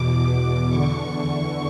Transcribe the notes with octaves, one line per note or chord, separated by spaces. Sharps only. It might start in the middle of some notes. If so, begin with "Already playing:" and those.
Already playing: E2 B2 D6
D6
E2 D3 C#6